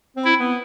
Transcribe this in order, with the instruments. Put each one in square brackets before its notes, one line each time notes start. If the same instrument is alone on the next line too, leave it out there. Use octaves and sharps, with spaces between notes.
[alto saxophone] C4
[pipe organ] E4
[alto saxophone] B3